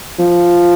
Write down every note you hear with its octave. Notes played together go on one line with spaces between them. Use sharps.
F3